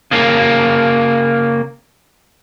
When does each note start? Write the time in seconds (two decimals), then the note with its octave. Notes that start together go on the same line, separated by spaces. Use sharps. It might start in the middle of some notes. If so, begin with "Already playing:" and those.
0.11 C#3 A#3